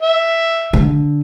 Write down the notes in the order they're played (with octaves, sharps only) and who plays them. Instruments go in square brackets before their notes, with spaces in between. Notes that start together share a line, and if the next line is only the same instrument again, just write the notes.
[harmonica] E5
[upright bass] D3